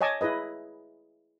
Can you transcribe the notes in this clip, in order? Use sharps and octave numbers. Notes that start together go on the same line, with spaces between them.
C#5 D#5 G#5 A5 D6
E4 G#4 B4 D#5